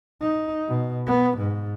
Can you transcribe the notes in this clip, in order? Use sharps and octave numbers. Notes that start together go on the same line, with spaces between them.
D#4
B2
B3
G#2